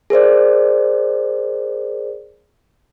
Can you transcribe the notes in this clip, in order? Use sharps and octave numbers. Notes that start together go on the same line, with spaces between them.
G#4 A#4 C5 D5